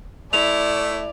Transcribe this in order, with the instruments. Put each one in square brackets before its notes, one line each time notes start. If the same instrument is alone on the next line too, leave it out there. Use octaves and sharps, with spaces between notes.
[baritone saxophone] A3 [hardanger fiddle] E4 [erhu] D5 [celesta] F7